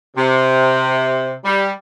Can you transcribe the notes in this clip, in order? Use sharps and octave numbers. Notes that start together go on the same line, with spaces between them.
C3
G3